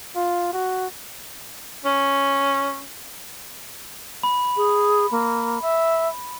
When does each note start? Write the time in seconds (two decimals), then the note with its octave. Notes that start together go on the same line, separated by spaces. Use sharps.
0.16 F4
0.53 F#4
1.85 C#4
4.23 B5
4.57 G#4
5.11 A#3
5.62 E5